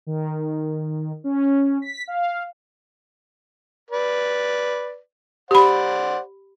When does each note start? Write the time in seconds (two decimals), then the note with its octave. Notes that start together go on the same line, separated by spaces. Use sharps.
0.07 D#3
1.24 C#4
1.82 B6
2.07 F5
3.91 B4 D5
5.51 G4 C5 D5 F#5 B5